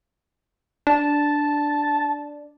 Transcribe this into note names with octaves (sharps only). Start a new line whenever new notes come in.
D4 A5